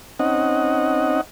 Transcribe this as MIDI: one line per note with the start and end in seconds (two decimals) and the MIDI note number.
0.19 1.21 60
0.19 1.21 61
0.19 1.21 63
0.19 1.21 75
0.19 1.21 78